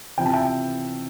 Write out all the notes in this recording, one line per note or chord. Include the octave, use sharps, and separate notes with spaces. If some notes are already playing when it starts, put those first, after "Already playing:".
C3 F3 C4 E4 G5
A5
E5 G5